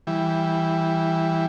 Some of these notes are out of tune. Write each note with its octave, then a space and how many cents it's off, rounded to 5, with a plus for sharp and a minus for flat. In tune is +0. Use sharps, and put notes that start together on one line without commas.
E3 +0 G3 +0